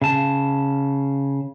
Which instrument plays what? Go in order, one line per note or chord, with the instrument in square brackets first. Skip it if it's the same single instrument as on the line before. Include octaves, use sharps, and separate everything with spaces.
[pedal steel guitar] C#3 A5